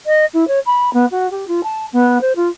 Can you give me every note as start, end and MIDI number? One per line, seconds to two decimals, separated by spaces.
0.06 0.25 75
0.33 0.47 64
0.47 0.59 73
0.66 0.92 83
0.93 1.06 59
1.11 1.30 66
1.31 1.45 67
1.47 1.61 65
1.63 1.86 81
1.93 2.21 59
2.21 2.32 72
2.36 2.48 65